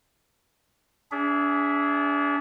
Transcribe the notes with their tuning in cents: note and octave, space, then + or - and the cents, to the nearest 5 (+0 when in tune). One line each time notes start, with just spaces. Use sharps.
D4 -35 G#4 +0 E5 +0